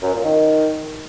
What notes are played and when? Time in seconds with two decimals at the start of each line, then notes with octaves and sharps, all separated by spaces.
0.02 F#2
0.12 A#2
0.23 D#3